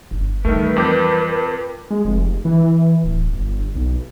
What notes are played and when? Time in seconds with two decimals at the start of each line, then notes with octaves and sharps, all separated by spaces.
0.11 G1
0.45 D#3 E3 G3 A3 A#4 B4
0.76 F2 A#4 D6 G6
1.91 G#3
2.05 F1
2.45 E3
3.04 D1
3.33 G1
3.75 B1